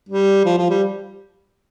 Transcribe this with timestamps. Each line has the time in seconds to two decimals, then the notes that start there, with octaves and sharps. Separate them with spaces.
0.09 G3
0.45 F3
0.57 F3
0.70 G3